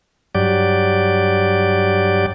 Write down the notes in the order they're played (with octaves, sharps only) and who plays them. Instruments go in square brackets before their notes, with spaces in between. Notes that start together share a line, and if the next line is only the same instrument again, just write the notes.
[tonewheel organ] G2 F#3 G4 D5